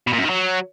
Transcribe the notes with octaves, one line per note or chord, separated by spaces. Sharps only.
B2
A#2
F#2
D#3
F#3